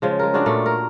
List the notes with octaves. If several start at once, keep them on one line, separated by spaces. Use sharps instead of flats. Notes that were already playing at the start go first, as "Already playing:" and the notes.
C#3 F3 G#3
G#3 A#4
D4 F4 F#4 G#4
A#2 A3
A#4